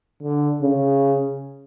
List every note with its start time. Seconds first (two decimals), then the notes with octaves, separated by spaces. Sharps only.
0.23 D3
0.62 C#3